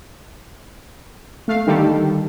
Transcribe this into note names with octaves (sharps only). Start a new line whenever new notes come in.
A3 F5
D3 D#3 G3 G4 A4